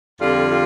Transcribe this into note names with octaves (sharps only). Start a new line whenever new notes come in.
F2 D3 G3 F4
F4